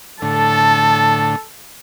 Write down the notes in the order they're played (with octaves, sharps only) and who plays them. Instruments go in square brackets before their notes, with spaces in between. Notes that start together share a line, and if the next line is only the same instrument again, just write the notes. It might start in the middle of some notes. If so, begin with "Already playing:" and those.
[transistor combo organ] A2 D3 [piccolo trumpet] A4 [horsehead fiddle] A5